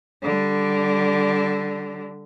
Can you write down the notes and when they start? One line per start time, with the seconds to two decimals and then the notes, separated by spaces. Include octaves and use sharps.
0.23 D3 G3